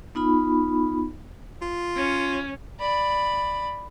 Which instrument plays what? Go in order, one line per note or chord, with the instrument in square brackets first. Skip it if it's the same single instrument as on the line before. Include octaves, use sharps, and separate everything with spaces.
[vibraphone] B3 D#4 F4 B5
[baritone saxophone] F4
[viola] C#4
[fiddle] D5 B5